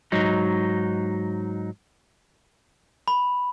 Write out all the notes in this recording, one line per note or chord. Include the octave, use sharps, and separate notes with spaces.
G#2 F#3 D#4
B5